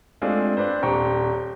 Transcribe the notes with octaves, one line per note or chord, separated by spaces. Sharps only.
G#3 A3 C4 D4 F4
C4 D4 B4 C5
D#1 D4 C5 G5 A#5 C#6